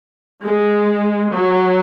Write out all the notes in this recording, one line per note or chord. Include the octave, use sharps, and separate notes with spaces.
G#3
F#3